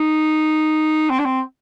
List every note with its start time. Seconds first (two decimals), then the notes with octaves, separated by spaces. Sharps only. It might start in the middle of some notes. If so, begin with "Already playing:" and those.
Already playing: D#4
1.10 C4
1.19 D4
1.25 C4